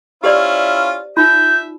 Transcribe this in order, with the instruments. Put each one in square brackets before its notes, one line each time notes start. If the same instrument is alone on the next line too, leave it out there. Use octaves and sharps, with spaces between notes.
[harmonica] C#4 E4 F4 [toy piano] G4 C5 D5
[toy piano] D#4 F4 [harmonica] E5 [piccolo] G6